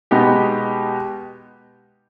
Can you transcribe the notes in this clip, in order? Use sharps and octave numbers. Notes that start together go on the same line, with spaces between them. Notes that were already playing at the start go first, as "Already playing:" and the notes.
B2 G#3 B3 D#4 G4